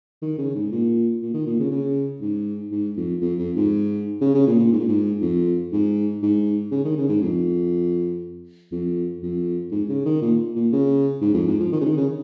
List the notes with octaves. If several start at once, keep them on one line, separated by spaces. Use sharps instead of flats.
D#3
C#3
G#2
A#2
A#2
D#3
A#2
C#3
C#3
G#2
G#2
F2
F2
F2
G#2
C#3
C#3
A#2
A#2
G#2
A#2
G#2
F2
G#2
G#2
C#3
D#3
C#3
G#2
F2
F2
F2
G#2
C#3
D#3
A#2
A#2
C#3
G#2
F2
G#2
F3
D#3
C#3
D#3
C#3